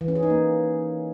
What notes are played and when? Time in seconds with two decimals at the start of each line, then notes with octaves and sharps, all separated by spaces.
0.01 E3
0.08 C#4
0.15 G#4
0.23 D#4
0.30 A#3